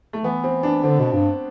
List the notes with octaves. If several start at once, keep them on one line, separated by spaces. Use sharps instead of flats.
A3
E3 B3
C4
D4
D3 C4
B2
G2